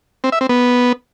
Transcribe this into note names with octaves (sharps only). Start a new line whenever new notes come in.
C4
E5
C4
B3